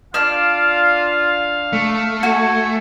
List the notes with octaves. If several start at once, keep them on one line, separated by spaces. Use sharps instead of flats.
D4 F4 F5 F6
A3
F#4 G#5